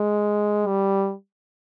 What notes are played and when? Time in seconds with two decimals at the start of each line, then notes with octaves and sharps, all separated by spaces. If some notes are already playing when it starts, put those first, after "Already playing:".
Already playing: G#3
0.67 G3